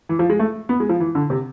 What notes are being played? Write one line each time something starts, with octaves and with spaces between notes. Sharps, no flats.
E3
F3
G#3
A3
B3
G#3
F3
E3
D3
C3